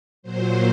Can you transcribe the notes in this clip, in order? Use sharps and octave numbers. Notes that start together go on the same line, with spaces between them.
A#2 F#3 C5